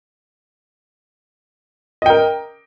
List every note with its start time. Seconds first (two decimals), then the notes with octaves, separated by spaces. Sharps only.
2.02 D#5
2.06 G5
2.10 A#4